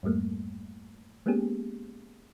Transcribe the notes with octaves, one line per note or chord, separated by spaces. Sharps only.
F2 G#2 G3 A3 A#3
G#3 A#3 B3 C#4 G4 G#4